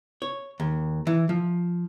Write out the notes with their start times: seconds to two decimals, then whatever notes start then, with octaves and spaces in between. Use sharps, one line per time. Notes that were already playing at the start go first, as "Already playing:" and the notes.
0.22 C#5
0.60 D#2
1.07 E3
1.29 F3